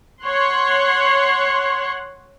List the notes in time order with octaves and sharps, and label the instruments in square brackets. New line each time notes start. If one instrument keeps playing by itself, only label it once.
[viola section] C#5 F#5 C6